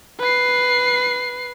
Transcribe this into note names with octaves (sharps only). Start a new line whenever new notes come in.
B4 C7